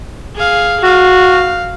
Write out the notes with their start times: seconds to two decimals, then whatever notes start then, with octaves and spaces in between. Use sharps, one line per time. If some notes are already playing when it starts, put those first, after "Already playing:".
0.35 G#4 F5
0.83 F#4 F5